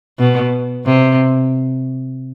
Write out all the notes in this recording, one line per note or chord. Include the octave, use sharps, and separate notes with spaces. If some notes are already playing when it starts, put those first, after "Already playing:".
B2
C3